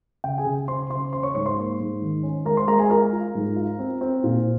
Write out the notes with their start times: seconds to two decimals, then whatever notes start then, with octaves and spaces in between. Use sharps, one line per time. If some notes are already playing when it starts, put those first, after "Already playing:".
0.24 C#3 G5
0.38 G#4 G#5
0.46 C#3
0.68 C#3 C5 C6
0.90 C#3 C5 C6
1.13 C#4 C5 C6
1.23 C#5 C#6
1.34 G#2 C#5 C#6
1.45 C5 C6
1.57 A#3
1.80 G#2
2.02 D#3
2.23 C#4
2.45 G#3 A#4 A#5
2.57 C5 C6
2.67 G#3 A#4 A#5
2.79 G#4 G#5
2.90 F4 A#4 A#5
3.13 F4
3.35 G#2
3.56 F4
3.79 C4
4.01 C4
4.24 A#2